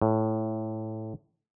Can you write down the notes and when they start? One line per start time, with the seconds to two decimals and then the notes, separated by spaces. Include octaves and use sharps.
0.02 A2